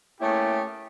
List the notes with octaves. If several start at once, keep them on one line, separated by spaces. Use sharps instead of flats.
A3 A#3 C#4 E4 G4 G#4